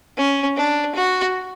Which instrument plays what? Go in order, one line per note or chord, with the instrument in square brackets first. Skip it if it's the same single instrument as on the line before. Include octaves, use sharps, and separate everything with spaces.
[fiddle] C#4
D4
F#4